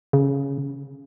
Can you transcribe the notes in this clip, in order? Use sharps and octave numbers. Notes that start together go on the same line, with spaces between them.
C#3